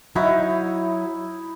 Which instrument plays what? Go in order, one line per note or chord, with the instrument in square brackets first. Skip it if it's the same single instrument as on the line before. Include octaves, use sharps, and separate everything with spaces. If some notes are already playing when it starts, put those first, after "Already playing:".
[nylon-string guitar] F#3 F#4 [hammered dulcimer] D#4 E4